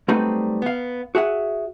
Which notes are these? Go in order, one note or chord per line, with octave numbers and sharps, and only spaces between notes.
F#3 G3 A3 C4 D#4 B4
B3 F5
F#4 G#4 E5 F#5